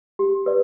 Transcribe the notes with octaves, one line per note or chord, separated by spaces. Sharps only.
G4
B4 D5